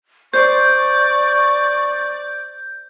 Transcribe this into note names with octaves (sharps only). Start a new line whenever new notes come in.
C5 D5 C#6 G6